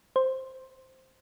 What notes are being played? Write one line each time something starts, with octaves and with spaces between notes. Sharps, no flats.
C5